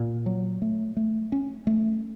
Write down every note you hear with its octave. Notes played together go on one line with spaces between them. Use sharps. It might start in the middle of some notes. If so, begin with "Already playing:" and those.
Already playing: A#2
F#3
A3
A3
C#4
A3